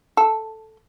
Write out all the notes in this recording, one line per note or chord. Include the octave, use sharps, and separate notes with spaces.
A4